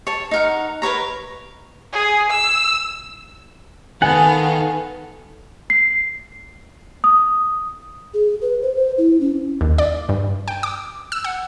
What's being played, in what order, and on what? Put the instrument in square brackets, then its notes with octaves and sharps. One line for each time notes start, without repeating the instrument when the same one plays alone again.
[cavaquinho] C#5 A5
D#4 A#4 F#5
A#4 B4 C#5 A#5
[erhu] G#4
E6
[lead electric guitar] D#3 [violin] B3 F5 [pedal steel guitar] A4 F#5 [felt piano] G#5
[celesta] C7
D#6
[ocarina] G#4
B4
C5
C5
E4
C#4
[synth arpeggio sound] D#2
D5
G2
G5
D6
E6
F#5